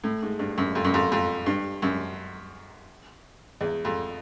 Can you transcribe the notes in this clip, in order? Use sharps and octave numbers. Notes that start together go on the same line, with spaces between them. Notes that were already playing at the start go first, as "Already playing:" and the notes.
A2
G#2
G2
F#2
F2
F#2
F2
F2
G2
F#2
E2
F2